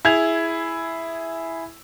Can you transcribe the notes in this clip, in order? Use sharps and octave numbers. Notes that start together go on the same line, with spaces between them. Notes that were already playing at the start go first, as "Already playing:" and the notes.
E4 G#4 G#6 F7